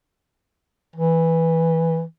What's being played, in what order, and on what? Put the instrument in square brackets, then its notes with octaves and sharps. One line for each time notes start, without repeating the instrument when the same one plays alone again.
[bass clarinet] E3